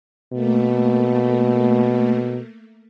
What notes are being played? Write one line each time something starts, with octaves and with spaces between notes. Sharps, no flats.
B2 A3 A#3